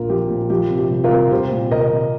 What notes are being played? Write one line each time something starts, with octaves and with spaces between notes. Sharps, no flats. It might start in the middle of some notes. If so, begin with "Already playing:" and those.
Already playing: A#1 A#2 F4 A#4
F3 G4
A#2
F3 G4
C3
G4
C2
F4 A#4
C2
C2 G4 C5
A#2
C2 A#4 D#5
C2